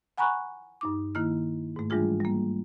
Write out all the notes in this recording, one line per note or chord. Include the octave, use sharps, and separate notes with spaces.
F#5 G#5 A#5 B5 C#6 F#6
G2 D#4 D6
D#3 A#3 E4 F6
G#2 A3
E3 G3 G#3 D4 F4 G#4
G3 A#3